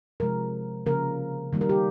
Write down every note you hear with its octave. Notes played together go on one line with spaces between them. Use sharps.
C3 F3 G#3 A#4
C#3 F3 A#3 A#4
D#3 G3 A#3
A#4
G4